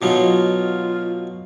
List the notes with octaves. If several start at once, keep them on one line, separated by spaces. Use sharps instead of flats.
B2 F#3 D#4 F4